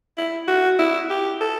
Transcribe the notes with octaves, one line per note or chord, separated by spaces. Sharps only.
E4
F#4
E4
G4
A4